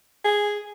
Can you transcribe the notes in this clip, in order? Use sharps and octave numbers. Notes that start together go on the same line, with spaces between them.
G#4